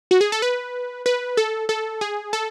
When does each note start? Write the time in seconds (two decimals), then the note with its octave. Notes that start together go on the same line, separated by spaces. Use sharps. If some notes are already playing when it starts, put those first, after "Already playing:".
0.11 F#4
0.21 G#4
0.32 A4
0.42 B4
1.06 B4
1.37 A4
1.69 A4
2.01 G#4
2.33 A4